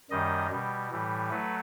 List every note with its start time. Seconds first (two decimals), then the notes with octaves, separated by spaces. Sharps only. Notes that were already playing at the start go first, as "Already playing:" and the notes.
0.10 F#2 D#3 G3 D#5
0.51 B2 G3
0.91 A2 E3 G3
1.31 F#3 A3 B4